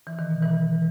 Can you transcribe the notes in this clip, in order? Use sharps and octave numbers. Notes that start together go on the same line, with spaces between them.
E3
D#3
B2
E3